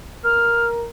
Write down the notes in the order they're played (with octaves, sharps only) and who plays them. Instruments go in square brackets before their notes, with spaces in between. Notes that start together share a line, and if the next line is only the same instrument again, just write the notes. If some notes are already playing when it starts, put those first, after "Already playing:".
[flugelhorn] A#4 [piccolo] F6